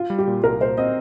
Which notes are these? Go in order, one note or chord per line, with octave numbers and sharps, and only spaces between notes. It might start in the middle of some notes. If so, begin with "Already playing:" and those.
Already playing: F4
G3
G4
A#2
C2 A#4
A#2 C5
C4 D#5